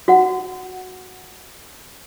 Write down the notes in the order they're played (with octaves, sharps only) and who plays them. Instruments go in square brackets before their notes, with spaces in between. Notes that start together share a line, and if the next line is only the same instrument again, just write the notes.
[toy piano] F#4 F#5